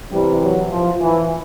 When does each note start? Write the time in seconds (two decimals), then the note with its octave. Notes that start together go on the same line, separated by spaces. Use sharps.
0.12 C3 E3 G3
0.41 F#3
0.70 F3
1.00 E3